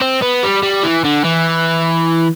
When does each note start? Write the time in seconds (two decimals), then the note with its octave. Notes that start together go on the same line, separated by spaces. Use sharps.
0.01 C4
0.22 B3
0.43 G3
0.63 G3
0.83 E3
1.04 D3
1.24 E3